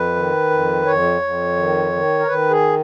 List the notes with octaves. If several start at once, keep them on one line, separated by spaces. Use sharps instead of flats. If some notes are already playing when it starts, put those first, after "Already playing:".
Already playing: F2 B4
D#3
F2
F2 C#5
F2
D#3
D#3
A#4
D#3 B4
G#4